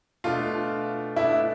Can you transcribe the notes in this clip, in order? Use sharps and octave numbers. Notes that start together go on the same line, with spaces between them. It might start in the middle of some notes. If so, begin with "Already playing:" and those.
B2 A3 D4 F4 F5
B2 A3 D4 E4 E5